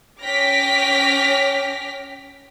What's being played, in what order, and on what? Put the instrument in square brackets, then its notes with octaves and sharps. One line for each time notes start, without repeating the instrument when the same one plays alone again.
[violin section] C#4 G5 D6 F6 A#6 B6